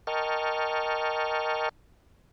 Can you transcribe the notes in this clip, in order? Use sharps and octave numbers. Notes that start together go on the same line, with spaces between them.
A#4 D#5 G5 A5 C#6 F6